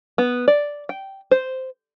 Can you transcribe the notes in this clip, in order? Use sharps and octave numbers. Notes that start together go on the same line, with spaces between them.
B3
D5
G5
C5